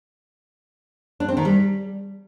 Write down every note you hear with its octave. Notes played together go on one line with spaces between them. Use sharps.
D4
C4
D#3
G3